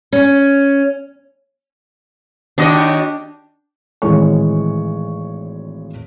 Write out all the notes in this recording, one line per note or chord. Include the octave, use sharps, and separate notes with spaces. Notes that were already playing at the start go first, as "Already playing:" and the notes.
C#4
D#2 D4 F#4 D#5 G5
G#1 A2 E3 G#3 C#5 C#6